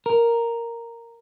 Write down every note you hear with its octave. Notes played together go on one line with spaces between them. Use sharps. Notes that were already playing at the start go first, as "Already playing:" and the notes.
A#4